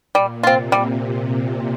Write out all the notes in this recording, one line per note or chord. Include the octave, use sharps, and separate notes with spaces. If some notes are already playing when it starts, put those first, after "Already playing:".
A#2 G3
C3 C4 F4
G3